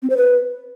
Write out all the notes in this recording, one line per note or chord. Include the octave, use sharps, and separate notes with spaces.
C4
C5
B4